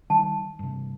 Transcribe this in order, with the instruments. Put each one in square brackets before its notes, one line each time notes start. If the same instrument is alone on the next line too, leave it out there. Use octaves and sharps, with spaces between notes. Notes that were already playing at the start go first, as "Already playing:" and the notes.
[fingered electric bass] D#3 G3 [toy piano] A5
[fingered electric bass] G2 C3